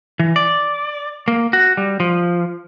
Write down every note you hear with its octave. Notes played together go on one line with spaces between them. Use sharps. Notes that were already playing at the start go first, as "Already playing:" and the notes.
E3
D5
A#3
F#4
G3
F3